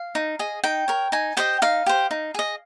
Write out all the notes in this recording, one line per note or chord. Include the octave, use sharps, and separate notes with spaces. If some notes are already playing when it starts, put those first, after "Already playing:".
Already playing: F5
D#4
G#4 D#5
D#4 G5
A#4 C#5
D#4 G#5
G4 C5 D#5 G5
D#4 F5
G4 C5
D#4
G#4 D#5